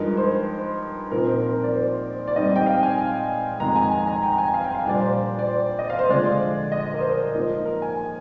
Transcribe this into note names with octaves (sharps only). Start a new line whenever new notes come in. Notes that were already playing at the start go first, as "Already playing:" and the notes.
Already playing: G2 F3 G#3 D#4 A#4
C5
A#2 F3 C4 D#4 A#4
C5
A#4
D5
C5
D5
G#2 G3 C4 D#4 D#5
G5
F5
G#5
F2 D#3 G#3 A#5
G#5
G#5
A#5
G5
A#5
G#5
F5
G5
F5
A#2 G3 D4 D5
C5
D5
C5
D#5
F5
C5
D3 F3 G#3 D5
D#5
A#4
C5
A#4
G#2 F3 A#3 D#4
A#4
G#5